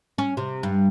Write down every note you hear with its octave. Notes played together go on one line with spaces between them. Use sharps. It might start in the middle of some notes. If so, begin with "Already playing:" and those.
C#4
C3
G2